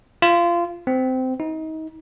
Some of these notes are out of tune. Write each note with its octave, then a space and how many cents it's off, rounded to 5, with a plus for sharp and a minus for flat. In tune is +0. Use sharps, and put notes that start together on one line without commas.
F4 -20
C4 -20
D#4 +30